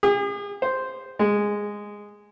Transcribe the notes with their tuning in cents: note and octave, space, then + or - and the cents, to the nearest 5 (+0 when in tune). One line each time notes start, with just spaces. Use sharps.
G#4 -45
C5 -5
G#3 -10